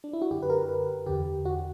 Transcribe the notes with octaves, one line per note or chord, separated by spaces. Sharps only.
D4
E4
F#4
F#2 D3 G4
B4
A#4
B4
E2 D3 G4
F#4